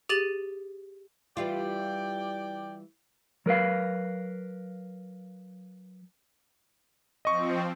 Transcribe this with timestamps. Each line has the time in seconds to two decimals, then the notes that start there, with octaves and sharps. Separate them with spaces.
0.09 G4 G#4 A6 D#7 F#7
1.37 E3 G3 F4 D5 G5
3.46 F#3 A#4 B4 F5
7.25 F3 C4 D#5 C#6